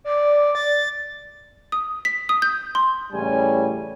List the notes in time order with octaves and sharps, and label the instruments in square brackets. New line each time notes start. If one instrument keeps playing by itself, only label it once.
[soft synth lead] D5
A6
[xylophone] D#6
B6
D#6
G6
C6
[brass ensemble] A1 A2 C#3 G3 C#4 G#5